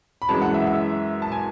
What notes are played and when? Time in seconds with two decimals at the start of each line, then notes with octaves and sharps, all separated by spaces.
0.22 B5
0.29 F#2 E3 G#3 A5
0.42 F#5
0.54 E5
0.67 E5
1.22 A5
1.32 G#5